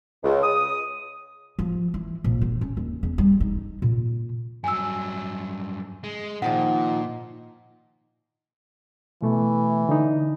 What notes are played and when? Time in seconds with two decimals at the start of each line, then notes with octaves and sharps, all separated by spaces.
0.24 C#2
0.42 D#6
1.59 F3
1.94 E3
2.24 A#1
2.41 D3
2.61 C#4
2.77 D#2
3.03 E2
3.18 G3
3.40 D#4
3.82 A#2
4.64 G2 F#3 G#5 E6
6.04 G#3
6.42 A#2 D#3 F3 D#4 F#5
9.22 B2 E3 A3
9.89 D3 D#4